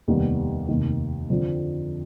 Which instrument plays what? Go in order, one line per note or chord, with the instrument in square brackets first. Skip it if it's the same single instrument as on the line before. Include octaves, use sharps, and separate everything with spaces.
[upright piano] F1 D#2 D#3 G3 B3
F1 D#2 D#3
F2 D3 F3